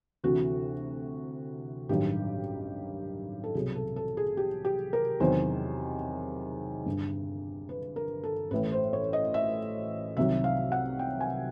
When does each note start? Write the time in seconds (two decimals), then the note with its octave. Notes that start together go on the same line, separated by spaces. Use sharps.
0.24 D2 C3 E3 F#4
1.89 A1 G2 D#3 F#3 G4
3.44 A4
3.55 C2 B2 F#3 G#4
3.76 A4
3.96 A4
4.17 G#4
4.37 G4
4.65 G4
4.93 A#4
5.20 E2 C3 D#3 F#3 C5
6.86 G1 G2 D3
7.69 B4
7.96 A#4
8.24 A4
8.51 A1 A2 E3 B4
8.72 C5
8.93 C#5
9.13 D#5
9.34 E5
10.17 C2 C3 D#3 F#3 E5
10.44 F5
10.72 F#5
10.99 G5
11.21 G#5